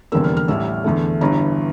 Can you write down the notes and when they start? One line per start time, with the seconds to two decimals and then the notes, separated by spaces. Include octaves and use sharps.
0.12 F1 E2 D3 G3 A#3 E6
0.24 F6
0.37 F6
0.48 A1 A2 G3 E6
0.84 E2 D3 A3
1.21 G1 G2 E3 A#5